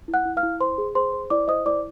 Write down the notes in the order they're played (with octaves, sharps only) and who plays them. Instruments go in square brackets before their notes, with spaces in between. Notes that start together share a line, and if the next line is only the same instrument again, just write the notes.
[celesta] E4
F#5 F#6
E4
F5 F6
E4
C5 C6
G#4
G#4 C5 C6
C5
E4 D5 D6
C5 D#5 D#6
E4 D5 D6